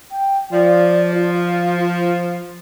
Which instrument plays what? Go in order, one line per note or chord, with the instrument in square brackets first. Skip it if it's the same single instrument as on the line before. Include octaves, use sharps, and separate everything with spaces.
[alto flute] G5
[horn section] F3 [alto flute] D5
[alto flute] F4